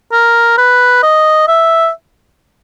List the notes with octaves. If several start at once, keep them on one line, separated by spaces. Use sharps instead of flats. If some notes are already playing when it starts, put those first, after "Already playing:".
A#4
B4
D#5
E5